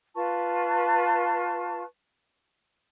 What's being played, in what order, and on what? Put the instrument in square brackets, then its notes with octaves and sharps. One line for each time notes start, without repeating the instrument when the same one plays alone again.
[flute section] F4 B4 A5 C#6